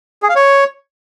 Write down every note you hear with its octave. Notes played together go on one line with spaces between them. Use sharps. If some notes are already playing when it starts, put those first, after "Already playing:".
G#4
F5
C#5